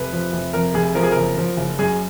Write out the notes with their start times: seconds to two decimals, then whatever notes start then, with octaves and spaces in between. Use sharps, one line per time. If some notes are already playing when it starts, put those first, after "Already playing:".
Already playing: F1 B4
0.13 F3
0.33 F1
0.54 F2 A#4
0.74 F1 G#4
0.95 F3 A#4
1.03 G#4
1.12 F#1 A#4
1.37 F3
1.57 F#1
1.79 F#2 G#4